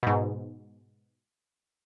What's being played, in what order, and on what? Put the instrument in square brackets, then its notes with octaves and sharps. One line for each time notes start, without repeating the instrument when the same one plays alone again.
[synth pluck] G#2 B2